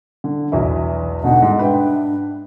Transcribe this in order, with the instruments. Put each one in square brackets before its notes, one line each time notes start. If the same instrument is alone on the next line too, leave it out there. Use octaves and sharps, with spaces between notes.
[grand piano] D3
B1 E2 E4
[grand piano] B2 D3 D#4 [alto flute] F#5
[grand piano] G#2
[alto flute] D4 [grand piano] B4 E5 G5